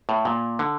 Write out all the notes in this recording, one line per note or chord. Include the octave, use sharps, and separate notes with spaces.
A2
A#2
D3